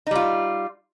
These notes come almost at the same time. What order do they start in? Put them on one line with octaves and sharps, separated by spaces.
D#4 G3 F4